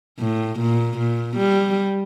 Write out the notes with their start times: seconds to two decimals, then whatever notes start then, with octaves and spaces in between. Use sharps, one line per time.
0.19 A2
0.59 A#2
0.98 A#2
1.37 G3